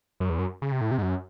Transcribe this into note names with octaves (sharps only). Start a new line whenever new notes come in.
F#2
E2
F#2
C#3
C3
A2
C3
G#2
F#2